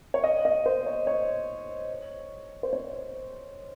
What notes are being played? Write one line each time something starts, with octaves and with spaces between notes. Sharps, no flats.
C#5
D#5
D#5
C5
C#5
C#5
C5
C#5